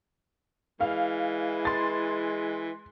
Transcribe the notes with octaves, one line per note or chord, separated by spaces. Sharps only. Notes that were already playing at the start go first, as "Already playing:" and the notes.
E3 G#3 F5
C6 A6